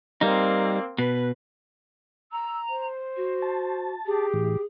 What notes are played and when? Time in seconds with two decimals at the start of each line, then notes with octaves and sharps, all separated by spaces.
0.21 G3 A#3 C4 D#4
0.98 B2 B4
2.32 A#5 E6
2.69 C5
3.16 F#4
3.42 A5
4.06 G4 G#4
4.34 A2 E3